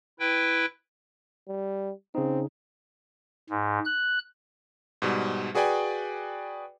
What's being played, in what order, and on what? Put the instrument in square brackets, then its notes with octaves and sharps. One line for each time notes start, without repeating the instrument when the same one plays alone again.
[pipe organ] E4 B4 G5
[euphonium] G3
[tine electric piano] C#3 D#4 [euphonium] C4
[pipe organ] G#2
F#6
[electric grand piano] G#2 B2 G3
F#4 G#4 B4 D5 G5 G#5